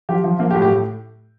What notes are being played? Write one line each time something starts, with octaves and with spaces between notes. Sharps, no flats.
F3 G4
F3
F3 A#3
G4
A2
G4
A2